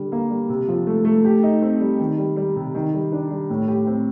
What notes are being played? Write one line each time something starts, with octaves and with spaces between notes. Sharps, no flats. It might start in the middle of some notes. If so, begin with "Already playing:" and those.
Already playing: D3 G3
A#3
G3
C3
F3
A3
A3
G4
D#4
C4
G3
D#3
G3
G3
C3
D#3
G3
D4
G3
A2
G4
C4